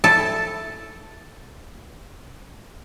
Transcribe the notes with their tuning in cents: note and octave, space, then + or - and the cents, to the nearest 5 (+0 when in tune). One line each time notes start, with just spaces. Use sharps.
E4 +0 A4 +0 A5 +0